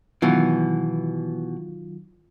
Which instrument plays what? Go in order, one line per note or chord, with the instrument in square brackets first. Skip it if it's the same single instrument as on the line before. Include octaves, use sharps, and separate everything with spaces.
[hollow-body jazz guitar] B2 E3 [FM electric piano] D#3 F#3 F4